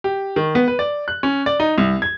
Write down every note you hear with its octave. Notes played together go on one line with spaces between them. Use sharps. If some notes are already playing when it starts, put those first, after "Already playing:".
G4
D#3
B3
B4
D5
F#6
C#4
D5
D#4
C2
G#6